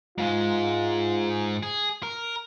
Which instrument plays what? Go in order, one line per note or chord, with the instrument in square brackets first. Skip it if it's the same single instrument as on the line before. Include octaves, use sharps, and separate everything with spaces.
[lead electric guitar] G#2 G#3 [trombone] F4
[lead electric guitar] G#4
A#4